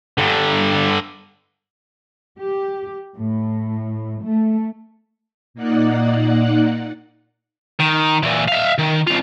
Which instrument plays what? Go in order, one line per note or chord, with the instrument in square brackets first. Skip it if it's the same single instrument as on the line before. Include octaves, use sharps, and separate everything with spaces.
[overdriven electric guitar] G2 D3
[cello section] G4
A2
A3
[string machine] A#2 A#3 D#4 D5 F#5 F#6
[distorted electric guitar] D#3
A#2 E3
E5 F5
D#3
C2 F4